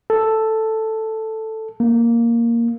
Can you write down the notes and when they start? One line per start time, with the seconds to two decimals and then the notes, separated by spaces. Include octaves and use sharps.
0.10 A4
1.80 A#3